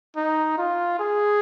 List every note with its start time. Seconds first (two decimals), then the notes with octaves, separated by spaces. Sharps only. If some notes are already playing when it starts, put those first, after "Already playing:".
0.16 D#4
0.58 F4
0.99 G#4